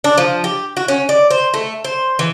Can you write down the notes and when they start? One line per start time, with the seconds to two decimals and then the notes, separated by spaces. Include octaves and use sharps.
0.04 D4
0.18 F3
0.44 G4
0.77 F#4
0.88 C#4
1.09 D5
1.31 C5
1.54 A3
1.84 C5
2.19 E3